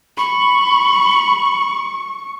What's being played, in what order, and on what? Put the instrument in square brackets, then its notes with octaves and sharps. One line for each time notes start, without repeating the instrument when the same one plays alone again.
[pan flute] B5 [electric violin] C#6